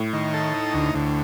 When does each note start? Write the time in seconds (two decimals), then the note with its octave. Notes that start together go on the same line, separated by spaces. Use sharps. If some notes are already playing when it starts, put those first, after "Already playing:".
Already playing: A2
0.13 D#3
0.34 A4
0.54 D#4
0.74 D2
0.95 D2